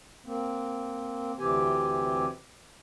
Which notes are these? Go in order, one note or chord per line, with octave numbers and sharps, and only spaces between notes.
A#3 C4
D2 C3 E3 C4 G4 G#5